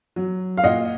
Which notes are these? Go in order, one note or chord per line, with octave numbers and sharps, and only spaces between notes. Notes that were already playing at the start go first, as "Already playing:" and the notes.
F#3
F5
A#2 D#5 F#5